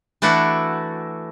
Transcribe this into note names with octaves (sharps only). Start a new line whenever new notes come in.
E3 A3 D4 E4 F#4